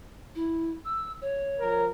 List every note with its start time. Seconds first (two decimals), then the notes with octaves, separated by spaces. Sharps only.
0.35 E4
0.85 E6
1.21 C#5
1.59 F3 A#4